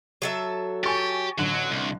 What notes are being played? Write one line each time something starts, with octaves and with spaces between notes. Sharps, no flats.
F#3 A4 E5
G4 G#5 C#6 A6
A1 D3 F#3 F#6
C2